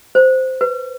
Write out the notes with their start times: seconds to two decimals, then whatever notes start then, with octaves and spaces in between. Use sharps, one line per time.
0.15 C5
0.61 B4